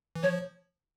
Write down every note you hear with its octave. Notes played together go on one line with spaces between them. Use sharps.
E3
F3 C#5